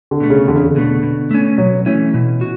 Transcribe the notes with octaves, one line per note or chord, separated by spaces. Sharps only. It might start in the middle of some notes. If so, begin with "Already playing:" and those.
D3
B2 A3
C#3
E2 D3
C#3
D3
B2 A3
B2
A3 C#4
B2 F#3
E3 A3 C#4
B2
F#4